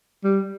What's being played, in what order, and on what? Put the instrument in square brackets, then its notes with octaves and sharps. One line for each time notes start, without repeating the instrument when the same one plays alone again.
[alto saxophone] G3